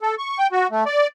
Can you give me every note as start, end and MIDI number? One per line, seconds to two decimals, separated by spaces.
0.01 0.15 69
0.18 0.38 85
0.38 0.47 79
0.52 0.67 66
0.71 0.84 57
0.86 1.07 74